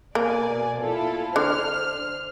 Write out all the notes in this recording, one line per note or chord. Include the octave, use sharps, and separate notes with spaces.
B2 A#3 D5 G#5
E4 F4 A4
D3 C5 F6